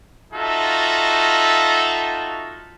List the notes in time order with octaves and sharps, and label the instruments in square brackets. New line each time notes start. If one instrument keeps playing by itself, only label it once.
[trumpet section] D#4 F4 F#4 A4 E5